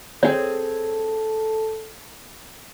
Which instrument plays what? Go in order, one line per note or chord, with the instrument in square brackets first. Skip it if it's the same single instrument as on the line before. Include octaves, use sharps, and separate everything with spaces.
[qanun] C4 G#4 [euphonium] A4 [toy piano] C#5